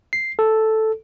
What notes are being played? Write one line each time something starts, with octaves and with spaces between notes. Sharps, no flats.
C7
A4